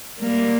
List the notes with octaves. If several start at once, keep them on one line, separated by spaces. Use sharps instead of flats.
G3 A#3